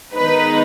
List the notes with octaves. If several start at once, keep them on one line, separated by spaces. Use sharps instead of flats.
D#3 G#3 B3 D#4 B4